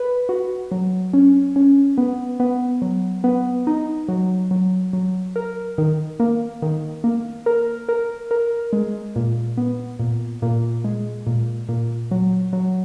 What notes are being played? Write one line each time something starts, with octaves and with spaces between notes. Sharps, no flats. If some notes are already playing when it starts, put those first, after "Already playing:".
Already playing: B4
F#4
F#3
C#4
C#4
B3
B3
F#3
B3
D#4
F#3
F#3
F#3
A#4
D#3
A#3
D#3
A#3
A#4
A#4
A#4
G#3
A#2
B3
A#2
A#2
G#3
A#2
A#2
F#3
F#3